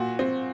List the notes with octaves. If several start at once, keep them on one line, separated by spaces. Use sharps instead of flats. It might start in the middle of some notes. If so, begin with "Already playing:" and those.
Already playing: A#2 F#4
C4